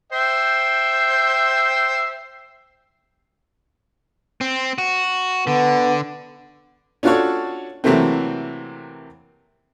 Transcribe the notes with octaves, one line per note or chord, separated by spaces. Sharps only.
C5 E5 G5
C4
F#4
D3 B3
C#4 D4 F4 F#4 A4 C#5
C3 E3 F#3 A3 A#3 C4